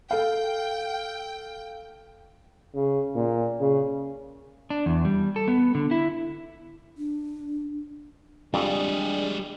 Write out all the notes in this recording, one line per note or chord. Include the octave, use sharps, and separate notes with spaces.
A4 F5 G5
C#3
A#2
C#3
D4
E2
G3
A4
B3
D3
E4
D4
F2 G3 G#3 D4 G4 G#4